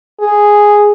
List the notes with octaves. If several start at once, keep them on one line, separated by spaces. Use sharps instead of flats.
G#4